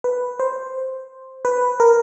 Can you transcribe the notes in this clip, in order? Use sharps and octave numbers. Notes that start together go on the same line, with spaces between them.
B4
C5
B4
A#4